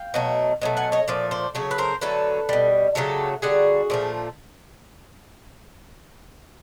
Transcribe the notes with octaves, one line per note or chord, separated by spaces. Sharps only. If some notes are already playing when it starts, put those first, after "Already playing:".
Already playing: F5 G5
B2 F#3 A3
B2 F#3 A3
F#5 G#5
C#5 D#5
A#2 F3 A3 D5
C5 D5
C#3 F#3 A3 C#5
B4
A#4 C5
D3 F#3 A3 A4 B4
B2 G3
C#3 F#3 A3 G4 A4
D3 G3 F#4 G#4
A#2 F3 A3